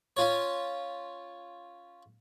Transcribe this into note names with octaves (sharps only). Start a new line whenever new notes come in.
C#4 F4 C#5